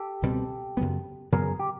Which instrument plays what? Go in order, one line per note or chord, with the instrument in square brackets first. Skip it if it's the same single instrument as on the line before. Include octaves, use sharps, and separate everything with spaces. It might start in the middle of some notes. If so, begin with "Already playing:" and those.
Already playing: [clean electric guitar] G4 A4
[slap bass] C#2 B2 G3 C4
F#2 C#3 F#3 B3
[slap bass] F#2 C#3 F#3 B3 [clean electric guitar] G#4 A#4
[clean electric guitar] G4